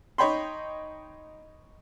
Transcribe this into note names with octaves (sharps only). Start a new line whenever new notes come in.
D#4 C#5 G5 B5 C6